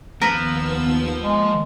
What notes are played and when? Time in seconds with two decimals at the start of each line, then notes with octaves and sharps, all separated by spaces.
0.21 D#2 F3 B3 A#4 B4 E6
1.23 G#3 A#3